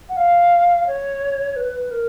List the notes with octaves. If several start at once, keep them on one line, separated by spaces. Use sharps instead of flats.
F#5
F5
C#5
B4
A#4